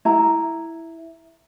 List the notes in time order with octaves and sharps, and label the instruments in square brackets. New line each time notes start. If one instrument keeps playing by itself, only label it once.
[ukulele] E4 A#5